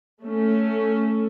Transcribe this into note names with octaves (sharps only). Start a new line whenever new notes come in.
A3 C#4